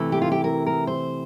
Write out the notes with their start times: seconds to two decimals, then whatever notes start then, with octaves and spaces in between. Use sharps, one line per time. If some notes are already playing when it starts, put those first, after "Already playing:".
Already playing: C3 E3 A3 E4
0.12 G4
0.22 F4
0.32 G4
0.44 A#4
0.66 A#4
0.87 C5